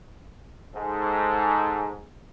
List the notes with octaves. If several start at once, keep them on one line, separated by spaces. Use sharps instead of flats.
G#2 A4